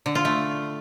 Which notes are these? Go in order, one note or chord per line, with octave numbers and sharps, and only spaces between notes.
D3
F4
A3